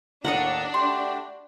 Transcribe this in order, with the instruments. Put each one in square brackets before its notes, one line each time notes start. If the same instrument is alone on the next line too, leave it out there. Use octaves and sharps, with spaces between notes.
[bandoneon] D#2 A2 A#5 [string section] D4 [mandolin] F#4 A4 D#5 [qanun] F#5
[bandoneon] A3 F#4 G4 [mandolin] C6